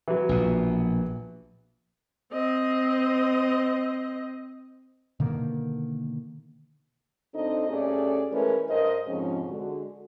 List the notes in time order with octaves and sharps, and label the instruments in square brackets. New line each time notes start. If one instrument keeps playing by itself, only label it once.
[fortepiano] E3 F#3
[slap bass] A#1 B2
[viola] C4 D#5
[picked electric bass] B2 D3 D#3 A#3
[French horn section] D2 C4 D4 D#4 A4 D#5
G2 A3 C#4 G4 G#4 D5
E3 G#3 A3 C#4 A#4 B4
G2 A#4 C5 D#5
F2 G#2 C3 F3 G#3 C#4
D3 G#3 F#4